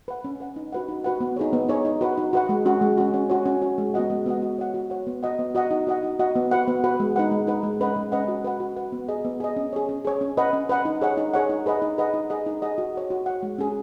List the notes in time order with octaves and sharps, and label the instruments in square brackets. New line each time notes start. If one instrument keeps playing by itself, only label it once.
[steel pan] B4 F#5
C#4
B4 F#5
D#4
F#4 B4 F#5
D#4
F#4 B4 F#5
B3
D#4 G#4 C#5
B3
D#4 G#4 C#5
D#4
F#4 B4 F#5
D#4
F#4 B4 F#5
G#3
C#4 F#4
G#3
C#4 F#4
C#4
F#4 C#5
C#4
F#4 C#5
G#3
B3 F#4 D#5 F#5
G#3
B3 F#4 D#5 F#5
F#4
C#5 F#5
F#4
C#5 F#5
B3
F#4 D#5 F#5
B3
F#4 D#5 F#5
D#4
F#4 D#5 F#5
D#4
F#4 D#5 F#5
B3
F#4 B4 F#5
B3
F#4 B4 F#5
G#3
D#4 B4 F#5
G#3
D#4 B4 F#5
G#3
C#4 B4 D#5 F#5
G#3
C#4 B4 D#5 F#5
F#4
B4 F#5
F#4
B4 F#5
B3
G#4 D#5
B3
G#4 D#5
C#4
G#4 C#5
C#4
G#4 C#5
C#4
B4 D#5 F#5
C#4
B4 D#5 F#5
D#4
G#4 C#5 F#5
D#4
G#4 C#5 F#5
D#4
G#4 B4 D#5 F#5
D#4
G#4 B4 D#5 F#5
D#4
G#4 D#5 F#5
D#4
G#4 D#5 F#5
F#4
C#5 F#5
F#4
C#5 F#5
G#3
C#4 G#4